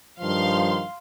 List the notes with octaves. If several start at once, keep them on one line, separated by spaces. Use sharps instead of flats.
G2 D#3 F3 F5 C6